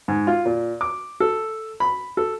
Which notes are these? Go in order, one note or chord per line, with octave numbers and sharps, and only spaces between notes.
G#2
F4
A#2
D6
A4
B5
A4